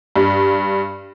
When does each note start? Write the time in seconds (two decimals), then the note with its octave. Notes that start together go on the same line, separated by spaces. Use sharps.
0.16 G2